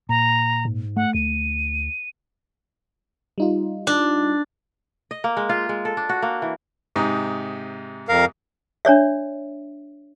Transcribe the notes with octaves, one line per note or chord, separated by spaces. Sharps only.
A#2 A#5
G#2
A3 F#5
D2 D#7
G3 D#4 F4
D4
D#5
A#3
G#3
F4
G#3
A4
D4
F#4
A#3
E3
G#2 C3 D#4
F2 A#4 F5
D4 C#5 D5 E5